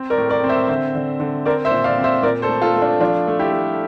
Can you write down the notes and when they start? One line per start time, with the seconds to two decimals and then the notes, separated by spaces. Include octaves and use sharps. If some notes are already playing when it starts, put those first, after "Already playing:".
Already playing: C4
0.10 A#4 D5
0.18 A2
0.30 A#4 D5
0.43 C4
0.49 C5 E5
0.68 D3 C5 E5
0.95 D3
1.20 D3
1.45 C4 A#4 D5
1.65 C5 E5
1.71 A#2
1.84 D5 F5
1.98 C4
2.04 C5 E5
2.23 A#2 A#4 D5
2.42 A4 C5
2.49 A3
2.62 F4 A4
2.76 A3
2.82 D4 F4
3.00 F3 D4 F4
3.27 A3
3.39 E4 G4
3.52 A3